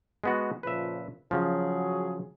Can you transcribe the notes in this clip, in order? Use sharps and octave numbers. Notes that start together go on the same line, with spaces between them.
G#3 B3 F#4
A#2 C#3 F3 B4 E5
C#3 F3 F#3 F#4 G#4